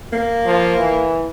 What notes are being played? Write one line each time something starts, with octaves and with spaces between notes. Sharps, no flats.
A#3
F3
E3